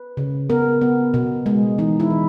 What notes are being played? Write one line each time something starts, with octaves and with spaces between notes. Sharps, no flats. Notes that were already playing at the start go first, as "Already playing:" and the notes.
Already playing: B4
C#3
B3 A#4
B3
B2
G#3
E3 D#4
E4
E3